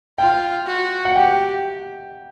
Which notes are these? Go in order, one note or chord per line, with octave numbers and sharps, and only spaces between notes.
F4 G5
F#4
F#5
G4 G5